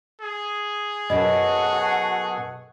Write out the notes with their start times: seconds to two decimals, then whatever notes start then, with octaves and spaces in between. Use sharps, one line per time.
0.21 G#4
1.10 F#2 B2 F#4 A4 B4 D#5 F#5